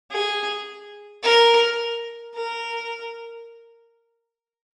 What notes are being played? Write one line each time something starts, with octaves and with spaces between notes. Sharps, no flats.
G#4
A#4
A#4